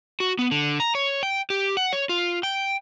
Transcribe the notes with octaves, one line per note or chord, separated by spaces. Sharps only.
F#4
B3
D3
A#5
C#5
G5
G4
F#5
C#5
F4
G5